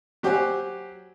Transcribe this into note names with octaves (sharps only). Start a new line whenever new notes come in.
F#3 G4 C5 F#5 G#5 F#6